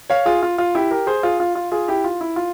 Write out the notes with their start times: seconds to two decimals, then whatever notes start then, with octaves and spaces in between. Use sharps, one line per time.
0.10 C#5 F5
0.26 F4 G#4
0.43 F4
0.58 F4
0.75 E4 G4
0.91 G4 A#4
1.07 G#4 C5
1.23 F4 G#4
1.40 F4
1.55 F4
1.72 F4 G#4
1.88 E4 G4
2.04 F4
2.21 E4
2.36 F4